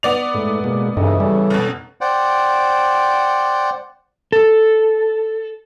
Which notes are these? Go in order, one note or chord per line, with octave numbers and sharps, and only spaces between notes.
B3 D5 F7
G#2 A3
B2 G#3 A#3
G2 C#3 E3 D#4 A4 D#5
G3 C#4 A4
F1 B2
C5 D5 F#5 G5
A4